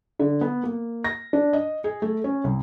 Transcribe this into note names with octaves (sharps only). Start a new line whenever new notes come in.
D3
B3
A#3
A#6
D4
D#5
G#4
A3
C#4
C2